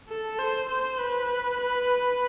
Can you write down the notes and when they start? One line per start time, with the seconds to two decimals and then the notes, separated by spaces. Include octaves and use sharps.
0.09 A4
0.39 C5
0.69 C5
1.00 B4
1.60 B4